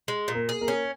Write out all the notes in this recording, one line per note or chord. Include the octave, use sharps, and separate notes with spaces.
G#3
A#2
A#3 A#4
G#4
A#3 A#4
C#4